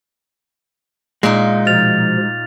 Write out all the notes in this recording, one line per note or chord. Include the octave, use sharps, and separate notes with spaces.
A#2 G#3 D#4
B2 F3 F6 A6 F7